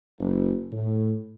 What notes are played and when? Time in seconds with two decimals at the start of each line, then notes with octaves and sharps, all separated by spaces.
0.18 F#1
0.71 A2